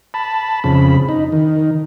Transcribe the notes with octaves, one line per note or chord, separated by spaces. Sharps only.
A5 B5
F2 C#3 B5
D#4
D#3